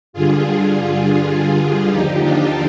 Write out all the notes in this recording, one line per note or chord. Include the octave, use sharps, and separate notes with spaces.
G2 D3 G3 F4 G#4
D#2 D3 F3 D#4 G4
D4 F4